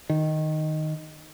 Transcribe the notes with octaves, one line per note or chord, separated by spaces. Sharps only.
D#3